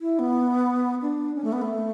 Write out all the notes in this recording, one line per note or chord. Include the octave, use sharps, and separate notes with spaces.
E4
B3
D4
C#4
A3
B3
A3